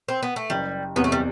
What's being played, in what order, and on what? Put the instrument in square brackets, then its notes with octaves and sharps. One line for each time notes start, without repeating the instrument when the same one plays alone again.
[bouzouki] C4
B3
A3
[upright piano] F#1 [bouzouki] G3
[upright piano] E2 C3 [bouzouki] B3
[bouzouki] A3
G3